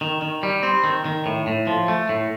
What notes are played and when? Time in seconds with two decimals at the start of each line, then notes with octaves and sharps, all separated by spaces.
0.01 D#3
0.22 D#3
0.43 G3
0.63 C4
0.84 D#3
1.05 D#3
1.26 A2
1.47 A2
1.67 F3
1.88 A3
2.09 A2